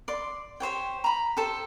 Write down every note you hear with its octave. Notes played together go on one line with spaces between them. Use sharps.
D5 C6
G4 C5 C#5 G5
A#5 B5
G4 A4 C5